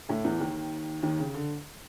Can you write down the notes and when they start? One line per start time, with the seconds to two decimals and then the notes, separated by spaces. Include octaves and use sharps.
0.09 A2 A3
0.24 E2 E3
0.40 D#2 D#3
1.03 D#2 D#3
1.19 C#3
1.34 D3